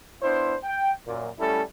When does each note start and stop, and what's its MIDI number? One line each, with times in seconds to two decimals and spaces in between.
0.22 0.54 59
0.22 0.54 62
0.22 0.54 64
0.22 0.54 72
0.63 0.92 79
1.06 1.29 42
1.06 1.29 46
1.39 1.61 55
1.39 1.61 57
1.39 1.61 61
1.39 1.61 64
1.39 1.61 69